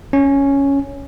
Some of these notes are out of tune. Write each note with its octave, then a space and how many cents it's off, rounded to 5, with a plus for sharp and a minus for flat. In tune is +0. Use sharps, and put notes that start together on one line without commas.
C#4 +0